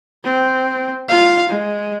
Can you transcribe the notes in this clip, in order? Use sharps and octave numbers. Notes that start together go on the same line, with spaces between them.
C4
F4 F5
G#3